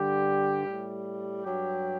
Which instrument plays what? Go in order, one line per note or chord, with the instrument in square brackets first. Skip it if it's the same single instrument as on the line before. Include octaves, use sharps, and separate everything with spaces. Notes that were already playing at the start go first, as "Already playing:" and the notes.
Already playing: [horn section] G2 D3 G3 G4
A2 G3
G2 F#3 G4